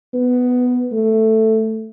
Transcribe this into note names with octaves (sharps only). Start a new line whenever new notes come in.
B3
A3